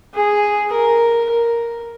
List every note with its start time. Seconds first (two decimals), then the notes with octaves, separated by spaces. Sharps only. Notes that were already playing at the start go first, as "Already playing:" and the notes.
0.14 G#4
0.72 A#4
1.30 A#4